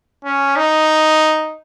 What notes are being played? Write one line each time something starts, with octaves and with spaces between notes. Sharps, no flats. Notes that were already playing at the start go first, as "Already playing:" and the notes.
C#4
D#4